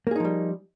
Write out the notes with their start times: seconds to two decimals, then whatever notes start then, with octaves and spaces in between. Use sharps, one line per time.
0.07 A#3
0.11 G#4
0.16 D#4
0.20 F3
0.25 G3